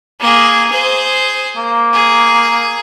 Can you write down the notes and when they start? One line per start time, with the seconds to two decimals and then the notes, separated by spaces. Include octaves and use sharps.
0.20 A#3 G#4
0.70 G#4 C5
1.57 A#3
1.93 G#4